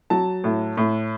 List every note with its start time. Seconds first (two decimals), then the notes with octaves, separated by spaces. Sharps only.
0.10 F#3 A5
0.44 A2
0.77 A2